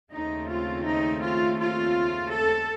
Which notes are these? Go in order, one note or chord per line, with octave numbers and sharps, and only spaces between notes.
D#2 C#3 A3 C4 D#4
F4
D#4
F4
F4
A4